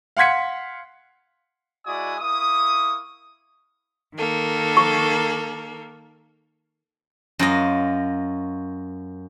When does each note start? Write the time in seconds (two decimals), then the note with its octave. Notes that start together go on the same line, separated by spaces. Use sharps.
0.17 F5 F#5 C6 G#6 B6 C#7
1.86 G#3 E4 F#4 D5 G#5 D#6
2.20 A#3 E4 C#6 D#6
4.16 D#3 A#3 A4
4.77 C#6
7.39 F#2 F4 D#5